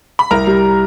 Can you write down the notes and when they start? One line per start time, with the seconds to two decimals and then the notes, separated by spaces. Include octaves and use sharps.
0.19 B5
0.31 C2 A#4 A#5
0.47 G3